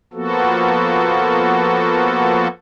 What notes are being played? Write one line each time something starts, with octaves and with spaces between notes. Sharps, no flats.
F3 A#3 B3 F#4 A4